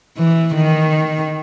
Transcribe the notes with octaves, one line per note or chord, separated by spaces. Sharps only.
E3
D#3